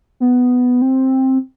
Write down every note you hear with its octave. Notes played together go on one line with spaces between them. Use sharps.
B3
C4